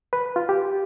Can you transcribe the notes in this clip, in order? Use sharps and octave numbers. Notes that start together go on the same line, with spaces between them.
B4
F4
G4